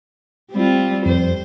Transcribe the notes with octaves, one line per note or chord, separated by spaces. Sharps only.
G3 C4 F4
F2 C5